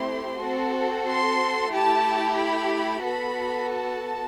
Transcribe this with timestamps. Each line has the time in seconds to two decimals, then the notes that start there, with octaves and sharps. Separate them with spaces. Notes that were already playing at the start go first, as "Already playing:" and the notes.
Already playing: A3 C4 E4 G4 C6
0.40 C4 F#4 A4
1.07 C6
1.72 A3 E4 G4 A5
2.38 B5
3.05 B3 F#4 A4 B5
3.71 A5